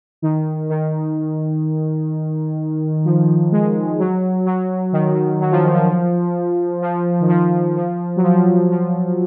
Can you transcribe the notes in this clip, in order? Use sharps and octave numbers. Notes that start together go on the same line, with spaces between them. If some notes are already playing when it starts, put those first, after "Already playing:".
D#3
D#3
F3
G#3
F#3
F#3
D#3
D#3
F#3
F3
D#3
F3
F3
D#3
F3
F3
F#3
F3
F3